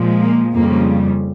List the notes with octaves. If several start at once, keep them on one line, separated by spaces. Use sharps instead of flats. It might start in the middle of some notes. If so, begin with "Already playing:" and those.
Already playing: A#2 F3 G#3
A#3
F2 C#3 G3 A#3